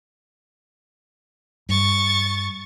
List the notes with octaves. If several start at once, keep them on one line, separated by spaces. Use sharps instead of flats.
G2 C#6 A6